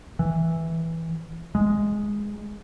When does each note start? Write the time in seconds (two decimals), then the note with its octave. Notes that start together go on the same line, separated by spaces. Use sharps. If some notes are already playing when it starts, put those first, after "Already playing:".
0.19 E3
1.55 G#3